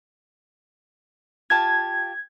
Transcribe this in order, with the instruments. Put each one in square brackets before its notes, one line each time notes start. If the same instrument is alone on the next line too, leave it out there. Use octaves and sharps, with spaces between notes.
[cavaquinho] F4 G4 A5 [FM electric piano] G#6